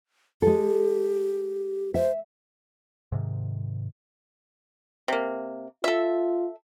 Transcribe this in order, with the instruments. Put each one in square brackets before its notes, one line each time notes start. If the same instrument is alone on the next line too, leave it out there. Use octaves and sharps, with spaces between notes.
[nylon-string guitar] G#3 A4 [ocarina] G4
[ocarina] C5 [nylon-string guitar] E5
[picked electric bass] G#2 C3 D#3
[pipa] C3 A#3
[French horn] F4 [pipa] A4 E5